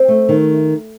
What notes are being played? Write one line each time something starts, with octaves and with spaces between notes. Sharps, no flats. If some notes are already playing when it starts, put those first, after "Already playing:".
Already playing: C4
A3
D#3